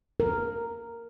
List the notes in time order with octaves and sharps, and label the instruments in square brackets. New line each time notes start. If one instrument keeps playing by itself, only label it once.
[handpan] A#4